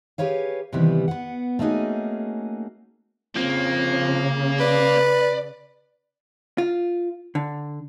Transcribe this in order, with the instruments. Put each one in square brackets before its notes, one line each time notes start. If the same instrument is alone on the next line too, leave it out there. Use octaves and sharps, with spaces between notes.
[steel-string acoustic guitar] G4 G#4 B4 C#5 F5
C3 D#3 E3 G3 B3
B3 F#5
A3 A#3 C#4 D#4 F#4 G#4
[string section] C#3 [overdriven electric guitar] F3 C4 [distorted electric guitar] A#3
[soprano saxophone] B4 [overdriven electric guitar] D5
[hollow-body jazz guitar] F4
D3